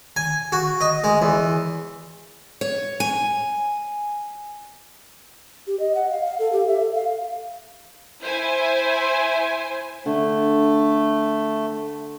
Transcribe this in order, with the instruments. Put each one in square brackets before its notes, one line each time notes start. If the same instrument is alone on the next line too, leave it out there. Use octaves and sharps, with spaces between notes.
[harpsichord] G#5
F#4
D#5
G#3
E2
[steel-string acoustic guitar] C#5
G#5
[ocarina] G4
D#5
F#5
F5
F5
A4
G4
E5
A4
F5
[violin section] E4 C5 G#5
[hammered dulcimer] D3 [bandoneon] A3